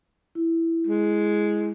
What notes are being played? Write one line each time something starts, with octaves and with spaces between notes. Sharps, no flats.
E4
G#3